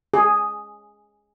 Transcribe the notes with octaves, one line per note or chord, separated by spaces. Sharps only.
G#4